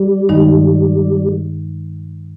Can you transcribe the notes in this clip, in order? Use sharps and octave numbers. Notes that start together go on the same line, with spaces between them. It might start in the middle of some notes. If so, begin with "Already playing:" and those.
Already playing: G3
G2 D#3 G#3 D#4